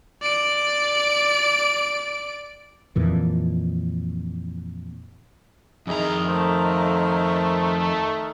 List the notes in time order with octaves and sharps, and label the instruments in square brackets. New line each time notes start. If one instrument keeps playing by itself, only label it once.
[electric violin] D5 D7
[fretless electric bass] F2 A#2 E3
[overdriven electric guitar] F2 A#5 [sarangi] D#3 [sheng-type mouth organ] E4 G#4 D#5
[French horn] A3 [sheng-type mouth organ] A#4 C5